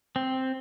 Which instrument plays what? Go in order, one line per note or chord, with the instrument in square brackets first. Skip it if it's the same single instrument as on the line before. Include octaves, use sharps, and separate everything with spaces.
[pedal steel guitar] C4